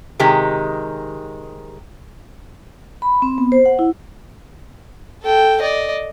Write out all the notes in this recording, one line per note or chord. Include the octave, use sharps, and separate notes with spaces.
C3 D#3 G#3 G4
B5
C4
B3
C5
F#5
E4
A4 G5
D5 D#5